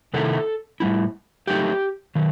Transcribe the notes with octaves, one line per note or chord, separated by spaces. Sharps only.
C3 D#3 A3 E4 A4
A2 G3 C4 E4
F#3 A3 D#4 G4
D#3 F#3